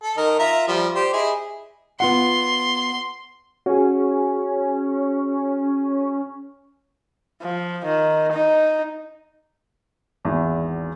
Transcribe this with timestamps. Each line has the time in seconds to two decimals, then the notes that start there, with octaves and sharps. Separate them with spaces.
0.03 A4
0.17 D#3 A#4 D#5
0.39 F4 E5 A#5
0.68 F3 G3
0.95 G4 C5 D5
1.13 E4 G#4 D#5
2.00 B3 F4 F#5 C6
3.66 C#4 F#4 G#4
7.42 F3
7.85 D#3
8.33 D#4
10.24 G#1 E2